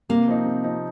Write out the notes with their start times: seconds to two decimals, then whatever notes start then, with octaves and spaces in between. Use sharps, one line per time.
0.09 C3 A#3
0.28 F3 C4 D#4
0.46 C3
0.64 F3 C4 D#4